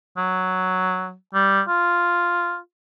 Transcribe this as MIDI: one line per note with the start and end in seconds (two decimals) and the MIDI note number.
0.17 1.14 54
1.34 1.61 55
1.68 2.58 65